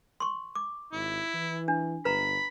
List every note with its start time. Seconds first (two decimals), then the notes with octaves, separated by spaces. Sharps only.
0.20 C6 C#6
0.55 D6
0.93 G#1 E4
1.34 E3
1.68 D4
2.05 G1 B4 A#5 B5